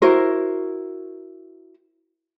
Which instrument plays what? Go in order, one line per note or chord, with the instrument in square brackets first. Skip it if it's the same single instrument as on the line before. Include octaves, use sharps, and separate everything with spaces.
[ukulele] E4 F#4 A#4 C5